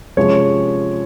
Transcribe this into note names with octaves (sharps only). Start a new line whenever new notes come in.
C3 F3 G#3 C#4 C#5